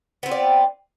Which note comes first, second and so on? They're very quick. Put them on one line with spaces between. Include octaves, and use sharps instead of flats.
B3 C4 F4 D5